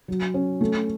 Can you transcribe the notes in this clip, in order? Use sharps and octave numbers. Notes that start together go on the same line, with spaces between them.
F#3
C#4
A3